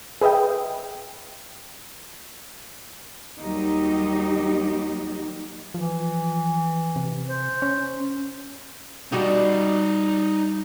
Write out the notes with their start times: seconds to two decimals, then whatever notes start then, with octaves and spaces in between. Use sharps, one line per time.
0.21 G#4 B4 D#5 E5 G5
3.41 D#2 F#3 G3 D#4 G4
5.74 E3 F3
6.96 C3
7.28 C5
7.62 C#4
9.12 G3 D#4 F#4 G4 D5